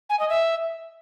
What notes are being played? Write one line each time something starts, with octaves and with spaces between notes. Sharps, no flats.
G#5
D#5
E5